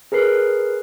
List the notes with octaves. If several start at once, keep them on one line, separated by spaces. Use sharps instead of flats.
G#4 A#4 B4 C7